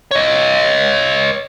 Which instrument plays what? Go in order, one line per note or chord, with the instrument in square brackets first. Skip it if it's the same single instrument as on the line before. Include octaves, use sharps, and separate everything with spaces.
[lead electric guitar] C#5 D#5